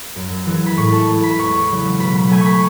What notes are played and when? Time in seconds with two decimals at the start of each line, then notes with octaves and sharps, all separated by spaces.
0.16 F#2
0.46 E3 G#3
0.66 B5
0.77 A2 C#6
0.92 A5
1.08 G#3
1.23 B5
1.39 E2 C#6
1.69 C#3 F#3
2.00 B2 B5
2.15 B5
2.29 F#3 A3 G#5
2.41 B5 C#6